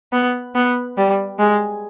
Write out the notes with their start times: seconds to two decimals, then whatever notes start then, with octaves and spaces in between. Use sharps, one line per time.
0.12 B3
0.55 B3
0.97 G3
1.39 G#3